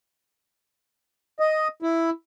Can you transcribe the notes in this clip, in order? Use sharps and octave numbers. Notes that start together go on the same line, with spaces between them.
D#5
E4